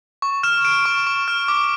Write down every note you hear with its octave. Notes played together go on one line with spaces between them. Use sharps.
C#6
F6 E7
F6 D7
C#6
C#6
F6
D6